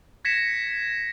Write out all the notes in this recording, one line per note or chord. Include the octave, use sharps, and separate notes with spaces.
G#6 A#6 B6 C#7 E7